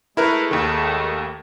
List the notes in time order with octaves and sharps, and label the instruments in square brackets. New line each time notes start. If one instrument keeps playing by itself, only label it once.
[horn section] G#3 A3 [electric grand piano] E4 A#4 B4
[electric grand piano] D#2 D#3